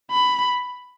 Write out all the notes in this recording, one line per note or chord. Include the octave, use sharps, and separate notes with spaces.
B5